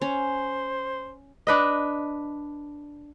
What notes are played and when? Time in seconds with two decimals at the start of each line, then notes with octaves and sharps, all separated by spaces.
0.02 C#4 C5
1.47 D4 B4 D#5